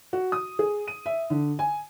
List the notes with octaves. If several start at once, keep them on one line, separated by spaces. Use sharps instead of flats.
F#4
D#6
G#4
D#7
E5
D3
G#5